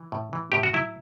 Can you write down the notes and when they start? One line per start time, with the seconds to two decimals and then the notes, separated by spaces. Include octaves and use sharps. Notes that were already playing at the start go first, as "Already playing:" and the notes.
Already playing: E3
0.12 A2
0.33 E3
0.52 A2 G4
0.63 F#4
0.73 F#3 E4